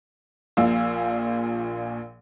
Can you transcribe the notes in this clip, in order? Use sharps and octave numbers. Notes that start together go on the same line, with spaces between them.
A#1 A#2 F3 F5 E6